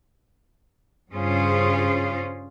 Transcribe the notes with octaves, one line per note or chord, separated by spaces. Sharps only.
G2 C#3 C#4 F4 G#4 C5